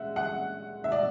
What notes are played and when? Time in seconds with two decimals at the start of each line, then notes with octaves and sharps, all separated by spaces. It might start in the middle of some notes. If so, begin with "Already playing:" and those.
Already playing: G#3 E5 F#5
0.16 F#5
0.84 E5
0.92 D5